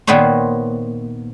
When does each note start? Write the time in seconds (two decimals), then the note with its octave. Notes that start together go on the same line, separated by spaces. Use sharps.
0.07 A#2 D#3 B3 D#4 C5 C#5